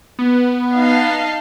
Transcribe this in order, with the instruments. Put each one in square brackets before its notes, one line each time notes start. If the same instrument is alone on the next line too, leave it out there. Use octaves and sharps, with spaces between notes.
[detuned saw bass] B3
[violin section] D#4 F5 A5